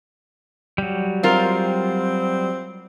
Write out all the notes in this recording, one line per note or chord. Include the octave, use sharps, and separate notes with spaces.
F#3 G3
C4 F4 A#4